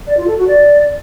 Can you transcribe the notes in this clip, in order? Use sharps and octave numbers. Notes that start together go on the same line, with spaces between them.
D5
F4
A4
F#4
D5